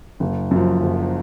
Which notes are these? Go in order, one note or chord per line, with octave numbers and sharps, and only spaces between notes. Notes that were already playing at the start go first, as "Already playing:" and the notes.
F#1
F#2 F3
F#1